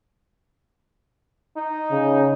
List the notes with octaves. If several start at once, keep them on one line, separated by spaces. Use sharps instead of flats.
D#4
C#3